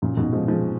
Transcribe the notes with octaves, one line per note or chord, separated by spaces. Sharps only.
F#2 A#2
G#2 B2
F3 G#3
F3 G#3